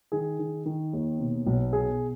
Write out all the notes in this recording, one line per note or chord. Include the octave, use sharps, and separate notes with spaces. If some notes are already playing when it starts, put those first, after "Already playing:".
D#3 G#4
D#3
D#3
D#2
B2
B1
B2 G#4